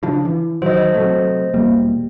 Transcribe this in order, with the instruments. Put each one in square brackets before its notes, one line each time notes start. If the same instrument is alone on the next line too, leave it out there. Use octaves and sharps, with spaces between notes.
[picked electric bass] C#3 F3 D4
E3
[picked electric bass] D#3 F#3 [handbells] C5 D#5
[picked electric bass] C3 F#3 A3
[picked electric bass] E1 G3 [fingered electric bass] A#3